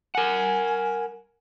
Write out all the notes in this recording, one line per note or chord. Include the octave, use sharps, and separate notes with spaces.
A#4 F#5 G#5